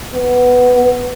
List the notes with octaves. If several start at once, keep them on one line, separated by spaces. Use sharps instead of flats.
B3